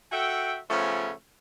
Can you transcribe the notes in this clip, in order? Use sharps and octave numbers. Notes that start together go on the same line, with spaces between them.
F#4 A4 E5 G5
C#3 F3 A3 B3 C#4